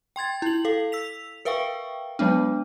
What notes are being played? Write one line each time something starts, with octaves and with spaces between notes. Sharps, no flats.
G5 C6 G#6 A6
E4 F#7
A4 F5
E6 B6 F7
A#4 B4 E5 F5 G5 C#6
F#3 G#3 B3 D4